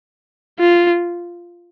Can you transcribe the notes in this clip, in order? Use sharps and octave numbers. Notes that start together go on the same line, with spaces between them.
F4